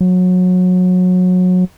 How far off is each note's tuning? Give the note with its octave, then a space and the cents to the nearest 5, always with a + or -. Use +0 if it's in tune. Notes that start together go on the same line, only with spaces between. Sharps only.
F#3 -25